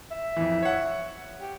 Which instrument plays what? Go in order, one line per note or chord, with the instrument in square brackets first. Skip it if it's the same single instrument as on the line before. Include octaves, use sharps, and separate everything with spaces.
[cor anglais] E5
[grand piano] F2 E3
C#5 F#5
[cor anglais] G4